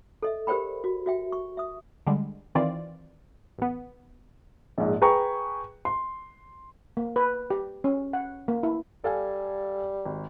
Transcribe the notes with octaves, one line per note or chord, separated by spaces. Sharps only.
A4 D#5 E5
G4 A#4 C5 D5 G5 B5
F#4
F#4 E5 G5
C#6
E5 D#6
D3 G3 G#3
D#3 E3 C4 F4 D5
A1 B3
A#1 G#2
G#4 B4 G5 A#5 C#6
C6
A#3
B4
G4
C#4
F#5
A#3
E4
G3 A4 F5 G#5
G#1